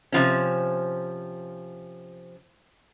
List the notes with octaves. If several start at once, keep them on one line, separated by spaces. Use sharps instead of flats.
C3 F3 C#4